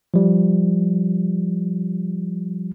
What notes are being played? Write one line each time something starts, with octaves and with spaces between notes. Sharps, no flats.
F3 G3